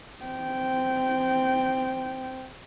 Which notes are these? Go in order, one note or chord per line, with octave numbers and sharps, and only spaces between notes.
C4 G5